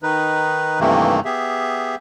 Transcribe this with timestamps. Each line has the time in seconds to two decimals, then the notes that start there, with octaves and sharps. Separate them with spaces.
0.03 D#3 D#4 B4
0.80 G2 C3 D#3 E3 A3 A#3
1.25 B3 G4 G#4 E5